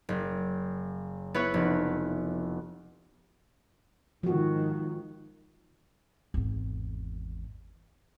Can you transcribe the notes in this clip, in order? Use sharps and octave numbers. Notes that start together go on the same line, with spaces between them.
F#1
B3 E4 B4 C#5
F1
G#2 D#3 F3 F#4
G#1 E2